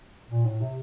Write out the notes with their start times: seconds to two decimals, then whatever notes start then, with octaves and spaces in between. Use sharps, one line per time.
0.29 A#2
0.45 A2
0.61 C3